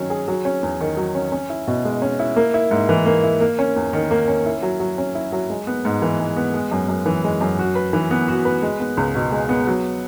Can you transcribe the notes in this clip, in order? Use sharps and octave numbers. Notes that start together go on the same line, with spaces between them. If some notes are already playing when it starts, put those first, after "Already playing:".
Already playing: D#3 F#3 C#4
G#4
F#3
C#4
E2
D#3
F#3
C#4
C#4
E4
B2
G#3
C#4
E4
A#3
E4
G#2
E3
A#3
E4
A#3
C#4
E2
D#3
A#3
C#4
E4
F#3
F#3
C#4
E4
F#3
G#3
B3
G#2
E3
G#3
B3
G#3
F#2
F#2
E3
G#3
F#2
F#4
B4
E3
B3
F#4
B4
G#3
B3
C#2
B2
G#3
B3
F#3